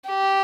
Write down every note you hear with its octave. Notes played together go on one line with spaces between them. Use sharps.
G4